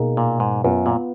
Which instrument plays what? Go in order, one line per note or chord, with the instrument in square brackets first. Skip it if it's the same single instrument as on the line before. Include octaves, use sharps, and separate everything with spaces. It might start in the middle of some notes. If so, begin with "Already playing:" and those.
Already playing: [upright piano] B2 A#3 D#4 G#4
[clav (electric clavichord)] A#2
G#2
[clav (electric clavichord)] F#2 [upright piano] B3 F4 B4
[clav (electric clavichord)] A#2